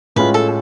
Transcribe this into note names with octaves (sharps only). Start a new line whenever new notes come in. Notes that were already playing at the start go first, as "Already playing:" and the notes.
A2 G#3 C#4 F4 B4
A4